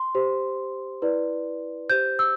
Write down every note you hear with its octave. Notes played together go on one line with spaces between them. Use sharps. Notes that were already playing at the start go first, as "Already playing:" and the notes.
Already playing: C6
G4 C5
E4 B4 D5
G4 C5 G6
E6